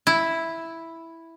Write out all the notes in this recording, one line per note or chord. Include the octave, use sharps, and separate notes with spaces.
E4